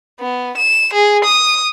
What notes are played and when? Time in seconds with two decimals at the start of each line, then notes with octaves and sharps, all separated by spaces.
0.20 B3
0.57 E7
0.94 G#4
1.24 D#6